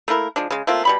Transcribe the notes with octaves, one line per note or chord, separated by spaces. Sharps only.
A3 A#3 E4 A#4
F3 G#3 D4
C#3 G#3
A3 A#3 C4 F4
B2 G3 B5